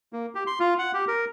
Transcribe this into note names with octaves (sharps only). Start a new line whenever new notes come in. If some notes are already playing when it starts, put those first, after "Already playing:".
A#3
G4
C6
F4
F#5
G4
A#4